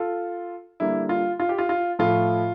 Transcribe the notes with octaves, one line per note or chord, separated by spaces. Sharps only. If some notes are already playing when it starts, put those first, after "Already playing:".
Already playing: F4 A4
D3 G3 A#3 E4
F4
F4
G4
F4
F4
A2 F3 A3 F4